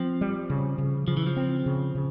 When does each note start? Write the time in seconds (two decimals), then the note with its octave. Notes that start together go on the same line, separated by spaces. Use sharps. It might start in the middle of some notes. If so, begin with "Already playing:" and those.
Already playing: F3 C4
0.21 G3
0.50 C#3
0.78 C#3
1.08 C#3 F3
1.17 E3
1.27 F3
1.37 C4
1.66 C#3
1.95 C#3